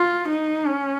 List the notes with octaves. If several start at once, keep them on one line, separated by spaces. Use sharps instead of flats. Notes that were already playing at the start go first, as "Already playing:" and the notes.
Already playing: F4
D#4
C#4